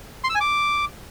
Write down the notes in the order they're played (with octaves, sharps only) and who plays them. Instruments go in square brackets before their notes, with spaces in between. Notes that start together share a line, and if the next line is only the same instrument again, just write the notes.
[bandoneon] C6
E6
G#5
D6